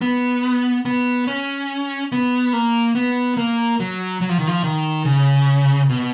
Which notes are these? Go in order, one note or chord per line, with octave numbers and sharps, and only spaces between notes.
B3
B3
C#4
B3
A#3
B3
A#3
F#3
F#3
F3
D#3
F3
D#3
C#3
B2